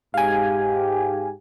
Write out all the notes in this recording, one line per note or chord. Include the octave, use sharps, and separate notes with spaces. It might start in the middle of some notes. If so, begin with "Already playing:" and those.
G#2 G4 F5 G#5